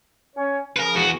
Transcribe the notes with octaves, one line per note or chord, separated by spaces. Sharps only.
C#4 C#5
C#3 F3 A#4 B4
E2 F#4